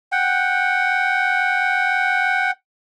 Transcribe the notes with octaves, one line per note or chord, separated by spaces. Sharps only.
F#5 G5